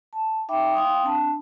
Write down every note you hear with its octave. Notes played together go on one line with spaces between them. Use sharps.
A5
D#4 E5 G5 B5 D6
F5 G5 C6 D#6
C4 D4 A5 B5